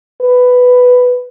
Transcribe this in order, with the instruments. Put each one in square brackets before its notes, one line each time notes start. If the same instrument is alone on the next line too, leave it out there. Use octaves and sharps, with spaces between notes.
[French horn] B4